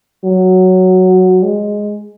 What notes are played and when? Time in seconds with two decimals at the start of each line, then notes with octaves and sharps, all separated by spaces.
0.24 F#3
1.43 G#3